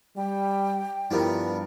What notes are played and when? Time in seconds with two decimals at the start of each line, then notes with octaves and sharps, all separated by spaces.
0.17 G3 G5
1.11 G2 F3 G3 B3 E4 A#4